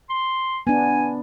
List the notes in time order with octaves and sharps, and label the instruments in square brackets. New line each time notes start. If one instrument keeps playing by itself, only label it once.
[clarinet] C6
[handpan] B3 D4 [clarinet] G#5